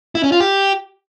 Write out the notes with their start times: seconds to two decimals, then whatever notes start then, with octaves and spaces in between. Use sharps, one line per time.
0.15 E4
0.24 C#4
0.32 F4
0.40 G4